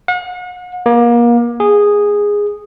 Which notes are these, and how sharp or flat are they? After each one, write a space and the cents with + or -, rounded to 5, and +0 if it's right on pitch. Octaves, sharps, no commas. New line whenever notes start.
F#5 -40
A#3 +30
G#4 -10